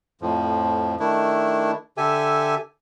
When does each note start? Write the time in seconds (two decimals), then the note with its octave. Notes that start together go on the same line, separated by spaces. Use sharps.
0.21 F2 A2 F3
1.00 D#3 A3 D4 E4
1.97 D3 G4 A4 E5 G#5